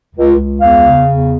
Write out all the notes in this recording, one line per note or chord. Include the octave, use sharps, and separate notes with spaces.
C#2
C#2
E2 F5
C#3
E2